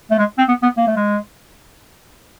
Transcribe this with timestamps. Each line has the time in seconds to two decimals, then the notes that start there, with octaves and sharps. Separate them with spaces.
0.10 A3
0.19 G#3
0.38 C4
0.48 B3
0.63 B3
0.77 A#3
0.87 A3
0.97 G#3